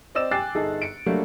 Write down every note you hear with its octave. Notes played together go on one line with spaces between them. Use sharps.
C4 D5 D#5 E6 E7
G5 G#5 D6 F#6 A6 C7
G1 D#4 G#4 A4
C#7 D7
F#3 G3 A3 A#3 D4